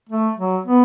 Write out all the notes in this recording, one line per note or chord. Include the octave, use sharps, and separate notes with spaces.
A3
F#3
B3